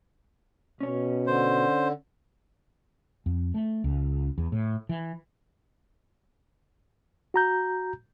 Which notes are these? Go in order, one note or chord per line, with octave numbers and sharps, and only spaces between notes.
B2 C#4 C#5
D3 C5
F2
A3
C#2
E2
A2
E3
F#4 A#5 G6